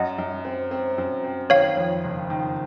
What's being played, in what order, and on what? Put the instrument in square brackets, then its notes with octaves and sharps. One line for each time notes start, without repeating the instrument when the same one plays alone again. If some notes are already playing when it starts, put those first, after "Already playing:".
Already playing: [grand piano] F#2 [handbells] D#5 F#5
[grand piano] F#2
C4
C4
F#2
C4
[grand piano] D#3 [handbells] C#5 F5
[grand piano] F2
F#1
D#3